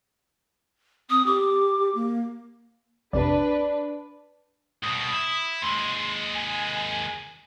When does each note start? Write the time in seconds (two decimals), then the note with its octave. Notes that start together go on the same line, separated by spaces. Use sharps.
1.10 C4 D#6
1.27 G4 D6
1.95 A#3
3.13 A#1 F2 C3 D4 B4 D5
4.83 C2 B2 D#6
5.11 E4
5.62 D#2 G#3 C6
6.35 G#5